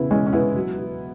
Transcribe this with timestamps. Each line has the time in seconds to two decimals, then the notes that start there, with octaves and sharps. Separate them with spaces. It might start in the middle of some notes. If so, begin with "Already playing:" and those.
Already playing: E2 C#3 E3 B3 E4
0.10 E3 G#3 C#4
0.26 C#4
0.33 E2 B3 E4
0.56 F#3
0.78 F#3